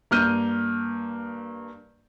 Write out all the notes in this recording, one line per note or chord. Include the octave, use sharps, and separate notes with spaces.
G2 A#3 F6 G6 D#7